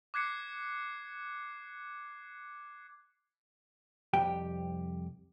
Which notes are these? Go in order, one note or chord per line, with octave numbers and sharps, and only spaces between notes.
D6 F#6 G#6 C7 C#7
C2 F2 G4 G5